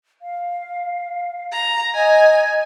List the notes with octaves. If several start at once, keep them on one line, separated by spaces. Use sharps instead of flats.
F5
A#5
D#5 G#5